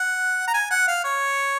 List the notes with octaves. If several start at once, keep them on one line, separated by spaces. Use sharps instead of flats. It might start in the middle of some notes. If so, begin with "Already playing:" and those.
Already playing: F#5
A#5
G#5
F#5
F5
C#5